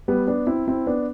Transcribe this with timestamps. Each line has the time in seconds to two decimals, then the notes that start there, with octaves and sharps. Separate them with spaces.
0.08 G3 B3
0.27 B3 D4
0.47 C4 E4
0.68 C4 E4
0.87 B3 D4